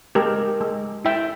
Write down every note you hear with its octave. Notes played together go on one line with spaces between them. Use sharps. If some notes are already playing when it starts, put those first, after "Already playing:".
G#3 G4 A#4
G#3
E4 E5 G5